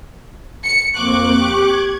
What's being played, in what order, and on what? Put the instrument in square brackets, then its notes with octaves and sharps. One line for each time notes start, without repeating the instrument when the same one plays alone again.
[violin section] C#7
[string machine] F2 A#3 C4 [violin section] C#6 D6 F#6
[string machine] G4
G#6